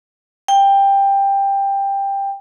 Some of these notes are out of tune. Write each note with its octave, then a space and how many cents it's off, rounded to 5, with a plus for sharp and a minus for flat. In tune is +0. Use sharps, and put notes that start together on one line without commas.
G5 +15